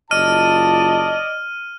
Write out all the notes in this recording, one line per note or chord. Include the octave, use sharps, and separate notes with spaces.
F#1 F4 D5 D#5 A5 F6 D#7